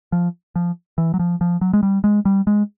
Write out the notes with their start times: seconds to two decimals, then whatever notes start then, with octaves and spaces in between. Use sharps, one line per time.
0.12 F3
0.56 F3
0.98 E3
1.14 F#3
1.19 F3
1.41 F3
1.61 F#3
1.73 G#3
1.83 G3
2.04 G#3
2.25 G3
2.47 G#3